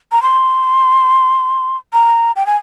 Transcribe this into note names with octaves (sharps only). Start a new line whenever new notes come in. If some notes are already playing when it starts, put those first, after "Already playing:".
A#5
C6
A#5
G5
G#5